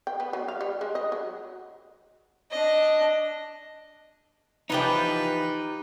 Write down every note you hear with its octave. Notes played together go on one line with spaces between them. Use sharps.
G5
B3
F#3
F5
G3
G#3
D#5
F#3
D4 D#5
E3 F3 D#4 G4 B4 G5